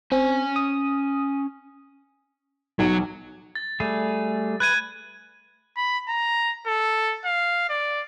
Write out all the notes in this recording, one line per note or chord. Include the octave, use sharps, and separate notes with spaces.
C4 C#4 G#5
D#6
B1 F#3
A6
G3 A3 G#4
B4 F#6 G#6 D#7
B5
A#5
A4
F5
D5